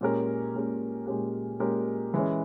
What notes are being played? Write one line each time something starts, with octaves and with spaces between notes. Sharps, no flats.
A#2 G#3 C#4 G4 A#4
A#2 G#3 C#4 G4 A#4
A#2 G#3 C#4 G4 A#4
A#2 G#3 C#4 G4 A#4
E3 G#3 C#4